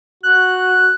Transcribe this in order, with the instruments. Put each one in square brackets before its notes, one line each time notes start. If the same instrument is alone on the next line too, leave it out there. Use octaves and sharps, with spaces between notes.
[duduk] F#4 [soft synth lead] F#6